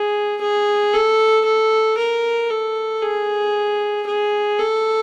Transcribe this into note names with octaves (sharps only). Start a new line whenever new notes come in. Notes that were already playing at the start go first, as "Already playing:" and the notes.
Already playing: G#4
G#4
A4
A4
A#4
A4
G#4
G#4
A4